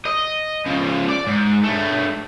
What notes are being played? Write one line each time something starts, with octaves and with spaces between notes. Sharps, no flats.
D#5
C#3 F3
D5
G#2
G2 A3